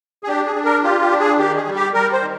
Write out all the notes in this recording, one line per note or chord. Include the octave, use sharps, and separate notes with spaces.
G#4
D4 G4
G#4
D4
A#4
F4 G4
G4
D4
G#4
D#3 G4
G#4
G3
G4
G3 A#4
C5
D#3